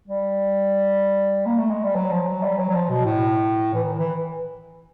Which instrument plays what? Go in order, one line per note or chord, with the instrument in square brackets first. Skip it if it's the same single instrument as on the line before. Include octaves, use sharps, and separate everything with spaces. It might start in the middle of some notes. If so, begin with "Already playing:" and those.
[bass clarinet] G3
A#3
A3
G#3
G3
F#3
F3
F#3
G3
F#3
F#3
F3
B2
A2
E3
D#3
E3